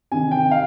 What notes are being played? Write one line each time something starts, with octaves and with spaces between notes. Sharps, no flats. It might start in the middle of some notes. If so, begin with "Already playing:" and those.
C3 D#3 G#5
G5
F5